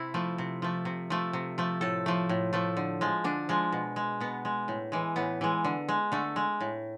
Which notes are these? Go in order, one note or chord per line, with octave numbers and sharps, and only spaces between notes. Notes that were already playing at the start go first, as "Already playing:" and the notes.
Already playing: C3 E4
F3 A3
C3
F3 A3
C3
F3 A3
C3
F3 A3
A2 A4
F3 A3
A2
F3 A3
D3
F3 G#3
D3 D4
F3 G#3
B2
G#3
B2 B3
G#3
A2
E3 G#3
A2 B3
E3 G#3
D3
G#3
D3 A3
G#3
A2